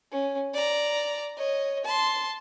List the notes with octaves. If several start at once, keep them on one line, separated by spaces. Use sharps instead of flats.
C#4
D5 A#5
C#5 D#5
A5 C6